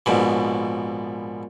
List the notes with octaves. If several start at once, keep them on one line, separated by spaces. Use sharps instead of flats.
A#1 G#2 B2